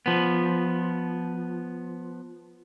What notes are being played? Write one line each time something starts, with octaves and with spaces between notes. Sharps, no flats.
F3 B3